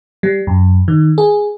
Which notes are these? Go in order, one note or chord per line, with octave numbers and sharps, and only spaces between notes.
G3
F#2
D#3
G#4